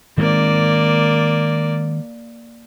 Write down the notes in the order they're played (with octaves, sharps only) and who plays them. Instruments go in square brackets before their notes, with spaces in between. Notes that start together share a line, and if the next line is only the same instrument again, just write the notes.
[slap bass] D#3 G#3 C4 [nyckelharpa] A#3 D5